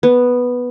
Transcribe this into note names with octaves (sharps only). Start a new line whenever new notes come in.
B3